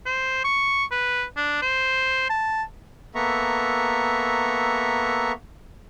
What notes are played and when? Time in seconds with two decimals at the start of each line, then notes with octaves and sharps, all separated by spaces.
0.06 C5
0.45 C#6
0.91 B4
1.37 D4
1.62 C5
2.30 A5
3.15 A#3 B3 A4 E5 A#5 C#6